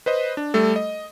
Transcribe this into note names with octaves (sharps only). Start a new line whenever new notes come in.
B4 C5 D#5
D4
G3 A3 A4
D#5